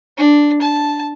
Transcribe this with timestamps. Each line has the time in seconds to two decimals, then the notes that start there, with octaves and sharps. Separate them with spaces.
0.18 D4
0.62 A5